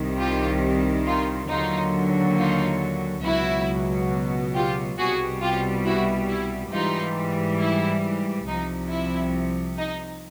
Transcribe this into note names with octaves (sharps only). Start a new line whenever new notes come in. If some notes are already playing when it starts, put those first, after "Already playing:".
Already playing: C2 C3 D#3 G3
F4 G4
D#4 F4
D#2 D3 F#3 D#4 F4
D#4 F4
C#2 B2 F#3 E4 F#4
F4 G4
C2 B2 G3 F#4 G#4
F4 G4
E4 F#4
E4
G#2 E3 G3 D#4 F4
E4
C2 C3 F3 D#4
E4
D#4